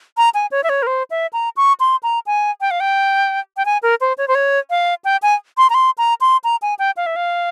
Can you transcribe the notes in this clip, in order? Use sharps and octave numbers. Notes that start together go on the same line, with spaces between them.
A#5
G#5
C#5
E5
C#5
A#4
C5
E5
A#5
C#6
C6
A#5
G#5
G5
F5
G5
G5
G#5
A#4
C5
C#5
C5
C#5
F5
G5
G#5
C6
A#5
C6
A#5
C6
A#5
G#5
G5
F5
E5
F5